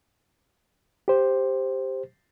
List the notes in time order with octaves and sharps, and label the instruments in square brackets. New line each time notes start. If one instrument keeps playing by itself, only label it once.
[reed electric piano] G4 C5